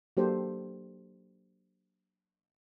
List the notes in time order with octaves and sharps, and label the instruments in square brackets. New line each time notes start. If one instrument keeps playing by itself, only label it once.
[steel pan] F#3 A#3 D4 G4 A4 C5